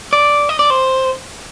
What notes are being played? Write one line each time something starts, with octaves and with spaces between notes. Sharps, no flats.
D5
D#5
D5
C5